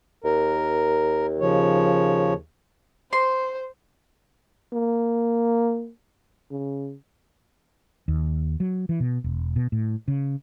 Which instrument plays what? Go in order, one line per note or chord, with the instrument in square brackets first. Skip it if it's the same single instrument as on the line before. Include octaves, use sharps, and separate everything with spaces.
[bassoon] D#2 [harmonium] A#4
[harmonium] C#3 F3 C#5
[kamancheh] C5 [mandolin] C6
[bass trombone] A#3
C#3
[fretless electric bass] D#2
F#3
E3
B2
E1
B2
A2
C#3